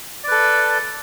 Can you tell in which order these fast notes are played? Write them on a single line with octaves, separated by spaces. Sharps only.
D5 B4 A4